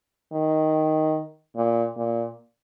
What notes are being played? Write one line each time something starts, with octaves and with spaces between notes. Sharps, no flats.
D#3
A#2
A#2